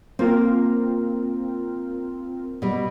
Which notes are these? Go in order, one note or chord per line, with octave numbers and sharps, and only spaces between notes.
A#3 C4 F4 A#4
B2 G3